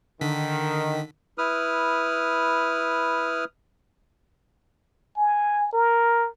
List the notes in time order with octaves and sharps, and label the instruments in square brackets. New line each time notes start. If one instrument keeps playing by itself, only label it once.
[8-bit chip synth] D3 B6 [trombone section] D#3
[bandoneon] E4 B4 D#6 F6
[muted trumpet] G#5
A#4